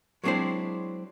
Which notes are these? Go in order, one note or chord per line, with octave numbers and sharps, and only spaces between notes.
F#3 G#3 C4 D4 E4 C5